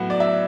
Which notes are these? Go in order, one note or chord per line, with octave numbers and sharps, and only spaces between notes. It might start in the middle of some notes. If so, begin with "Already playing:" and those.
Already playing: A2 F#3 B3 F#5
D5
E5